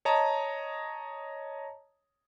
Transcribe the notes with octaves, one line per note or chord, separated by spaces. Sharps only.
C#5 D#5 A5 A#5